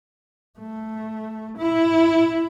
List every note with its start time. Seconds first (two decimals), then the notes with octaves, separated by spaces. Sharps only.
0.60 A3
1.59 E4